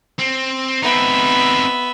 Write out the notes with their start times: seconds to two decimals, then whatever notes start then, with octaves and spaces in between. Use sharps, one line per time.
0.19 C4
0.83 B3 C4 D#4 E5